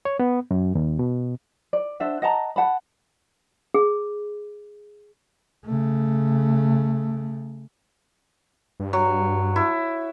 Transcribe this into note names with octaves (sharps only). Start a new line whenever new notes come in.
C#5
B3
F#2
D#2
B2
D5
D4 C5 E5 F#5
D#5 F#5 A5 A#5
F#5 A5 B5
G#4
C#3 A3
G2
F#3
E4